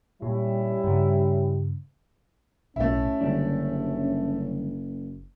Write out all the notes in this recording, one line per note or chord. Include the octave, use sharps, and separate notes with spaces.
A#2 G3 C#4 E4 G4
G2 C#3
B1 A2 A3 C#4 E4
F#1 D3 G3 D4